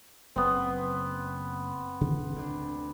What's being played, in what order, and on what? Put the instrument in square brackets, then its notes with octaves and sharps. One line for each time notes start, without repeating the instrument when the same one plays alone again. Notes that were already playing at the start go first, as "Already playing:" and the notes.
[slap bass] F#1 [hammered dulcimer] B3 C4
[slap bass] C#3
D2 C4 D4